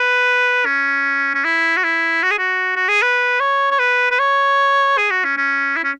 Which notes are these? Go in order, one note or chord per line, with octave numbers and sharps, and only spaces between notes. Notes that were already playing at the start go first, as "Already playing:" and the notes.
Already playing: B4
C#4
C#4
E4
F#4
E4
F#4
G#4
F#4
F#4
G#4
B4
C#5
C#5
B4
B4
C#5
G#4
F#4
C#4
C#4
E4
C#4